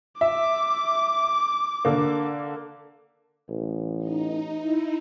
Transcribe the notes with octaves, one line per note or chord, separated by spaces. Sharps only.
E5 D6
D3 A#3
A1
D#4
D#4 E4